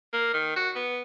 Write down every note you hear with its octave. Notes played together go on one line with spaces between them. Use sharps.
A#3
D#3
F#4
B3